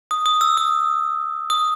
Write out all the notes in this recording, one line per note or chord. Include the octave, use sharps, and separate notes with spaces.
D#6
D#6
E6
D#6
D#6